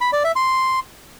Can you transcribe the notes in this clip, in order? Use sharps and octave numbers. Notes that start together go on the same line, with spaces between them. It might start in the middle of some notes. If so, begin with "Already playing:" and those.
B5
D5
E5
C6